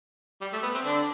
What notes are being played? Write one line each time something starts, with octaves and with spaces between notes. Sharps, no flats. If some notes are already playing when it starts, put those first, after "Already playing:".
G3
A3
B3
C4
D3 D4